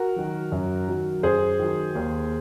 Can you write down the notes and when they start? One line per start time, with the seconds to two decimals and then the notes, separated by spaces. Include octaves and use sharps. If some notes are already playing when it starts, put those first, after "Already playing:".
Already playing: F#4 A#4
0.16 D#3 F#3
0.52 F#2
0.88 D#3 F#3
1.23 F#2 G#4 C5
1.60 D#3 F#3
1.95 D#2